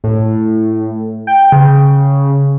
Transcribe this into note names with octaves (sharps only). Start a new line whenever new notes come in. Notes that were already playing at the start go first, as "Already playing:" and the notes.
A2
G5
C#3